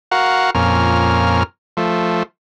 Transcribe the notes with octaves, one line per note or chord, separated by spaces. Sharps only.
F#4 A#4 F5 F#5
F2 A#2 C#4 A#4 F6
F3 A3